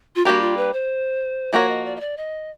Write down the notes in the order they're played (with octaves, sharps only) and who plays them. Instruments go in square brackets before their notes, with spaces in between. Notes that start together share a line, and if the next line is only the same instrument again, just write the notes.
[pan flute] F4
[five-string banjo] G3 A#3 D4 G4 A#4 [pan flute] F#4
[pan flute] F4
B4
C5
[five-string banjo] F3 A#3 D4 F#4 A#4 [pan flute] C#5
[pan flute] D#5
D5
D#5
D5
D#5